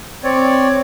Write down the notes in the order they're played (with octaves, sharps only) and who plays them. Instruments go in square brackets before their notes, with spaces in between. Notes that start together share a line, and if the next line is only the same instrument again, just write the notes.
[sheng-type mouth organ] C4 C#5 D5